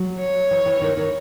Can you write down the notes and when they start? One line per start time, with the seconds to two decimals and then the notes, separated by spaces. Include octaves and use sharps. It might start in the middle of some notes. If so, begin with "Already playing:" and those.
Already playing: F#3
0.19 C#5
0.51 E3
0.66 E3
0.81 D#3
0.97 D#3